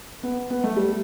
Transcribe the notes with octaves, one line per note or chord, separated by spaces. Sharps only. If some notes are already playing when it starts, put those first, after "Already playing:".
B3
B3
A3
G3